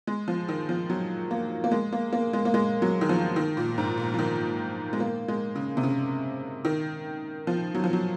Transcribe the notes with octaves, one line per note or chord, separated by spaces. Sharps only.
G#3
F3
D#3
F3
F#3
A#3
A#3
G#3
A#3
A#3
G#3
A#3
G#3
F#3
D#3
F3
D#3
A#2
G#2
A#2
F3
D#3
G#3
A#3
G#3
C#3
C3
C#3
D#3
F3
F#3
F3
F#3